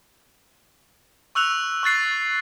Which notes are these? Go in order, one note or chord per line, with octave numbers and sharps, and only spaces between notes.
C#6 E6 F#6 F7
C#6 F#6 A6 C7